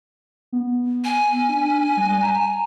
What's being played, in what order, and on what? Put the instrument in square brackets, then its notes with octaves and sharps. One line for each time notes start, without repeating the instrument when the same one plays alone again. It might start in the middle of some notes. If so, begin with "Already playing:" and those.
[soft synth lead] B3
[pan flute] G#5
[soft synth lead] D4
G3
A#5